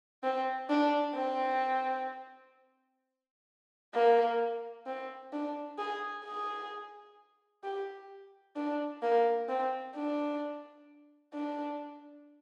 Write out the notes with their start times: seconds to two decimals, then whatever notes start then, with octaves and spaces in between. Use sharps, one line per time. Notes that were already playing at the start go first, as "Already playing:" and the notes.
0.23 C4
0.70 D4
1.16 C4
3.94 A#3
4.86 C4
5.32 D4
5.78 G#4
6.24 G#4
7.63 G4
8.56 D4
9.02 A#3
9.49 C4
9.95 D4
11.34 D4